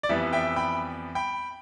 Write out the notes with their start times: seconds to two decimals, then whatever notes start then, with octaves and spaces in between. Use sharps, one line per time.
0.03 D5
0.09 F2 E3 G3 B3 E5
0.33 E5 G5
0.56 G5 B5
1.15 G5 B5